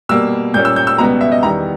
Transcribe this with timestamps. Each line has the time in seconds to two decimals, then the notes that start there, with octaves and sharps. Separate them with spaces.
0.09 B2 G3 A#3 E6
0.54 A#2 G3 A#3 C#4 G6
0.65 E6
0.76 G6
0.87 E6
0.98 C#2 B2 G3 B3 A#5
1.21 E5
1.32 D#5
1.43 E2 D#3 G3 B3 A#5